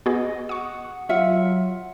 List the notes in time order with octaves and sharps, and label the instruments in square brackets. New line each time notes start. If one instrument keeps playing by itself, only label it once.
[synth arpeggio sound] B3 F#4 G#4 [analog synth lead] D#5
[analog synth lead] F#5 [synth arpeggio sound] C#6 D#6
[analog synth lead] F#3 [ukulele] F4 E5 F#5